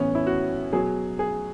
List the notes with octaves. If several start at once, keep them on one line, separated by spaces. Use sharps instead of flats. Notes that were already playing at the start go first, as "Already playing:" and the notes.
Already playing: A2 E3 B3 C#4
E4
F#4
B2 F#3 G#4
G#4